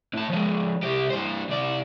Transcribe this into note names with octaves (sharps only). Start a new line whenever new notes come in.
A2 A5
F3 G#3
C2 G4
G2 C5
C3 D5